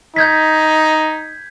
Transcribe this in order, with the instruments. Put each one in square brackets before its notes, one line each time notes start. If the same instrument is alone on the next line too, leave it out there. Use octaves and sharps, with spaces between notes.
[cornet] D#4 [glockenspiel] G6 G#6 B6